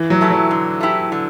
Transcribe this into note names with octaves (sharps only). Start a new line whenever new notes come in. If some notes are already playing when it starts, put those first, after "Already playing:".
Already playing: E3
F#3
A3 E4 G4
F#3
D3
A3 E4 G4
D3